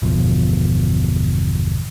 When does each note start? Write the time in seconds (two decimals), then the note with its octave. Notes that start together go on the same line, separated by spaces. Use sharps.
0.02 G1 E2 B2 F3